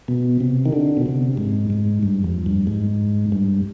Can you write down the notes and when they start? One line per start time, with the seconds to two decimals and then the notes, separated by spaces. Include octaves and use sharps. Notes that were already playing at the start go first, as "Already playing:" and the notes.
0.08 B2
0.41 C3
0.66 D#3
0.73 D3
0.97 B2
1.06 C3
1.38 G#2
1.70 G#2
2.03 G2
2.24 F2
2.46 G2
2.67 G#2
3.32 G2